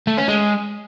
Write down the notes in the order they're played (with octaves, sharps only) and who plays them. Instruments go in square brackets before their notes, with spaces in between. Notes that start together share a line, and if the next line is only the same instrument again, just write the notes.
[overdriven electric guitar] A3
C#4
G#3